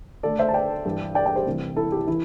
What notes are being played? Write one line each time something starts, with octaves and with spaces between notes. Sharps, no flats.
D2 D3 A4 D5
C5 E5
A5
D5 G5
G2 E3
D5 G5
D5 G5
G4 C5
C2 C3 E3
E4 A4
G4
E3 E4